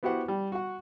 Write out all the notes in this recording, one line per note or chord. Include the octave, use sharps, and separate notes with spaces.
B3 E4 F#4 G4 C5 F#5
G3
F#4 F#5